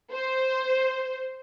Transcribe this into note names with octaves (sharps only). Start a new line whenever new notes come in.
C5